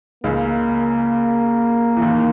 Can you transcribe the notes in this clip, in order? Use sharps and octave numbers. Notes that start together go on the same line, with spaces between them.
C#2 C#3 A#3
E3
D#2 D#3